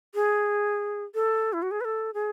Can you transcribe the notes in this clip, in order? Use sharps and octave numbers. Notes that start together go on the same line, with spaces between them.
G#4
A4
E4
F#4
G#4
B4
A4
G#4